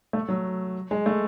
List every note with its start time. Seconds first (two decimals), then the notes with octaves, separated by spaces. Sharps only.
0.13 A3
0.29 F#3
0.91 G#3
1.06 A3